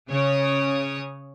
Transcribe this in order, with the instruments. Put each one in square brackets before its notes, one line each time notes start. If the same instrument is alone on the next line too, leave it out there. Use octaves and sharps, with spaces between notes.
[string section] C#3 C#5 D#6